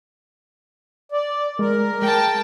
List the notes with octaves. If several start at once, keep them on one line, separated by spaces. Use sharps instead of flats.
D5
G#3 A#4
G#3 G5 A5